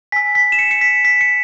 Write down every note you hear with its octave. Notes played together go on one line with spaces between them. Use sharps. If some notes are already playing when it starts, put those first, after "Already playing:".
G#5 E6 B6
B6
E7
C#7
C#7
B6
B6
C#7